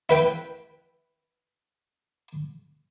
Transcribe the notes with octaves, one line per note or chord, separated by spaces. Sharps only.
E4 B4 G5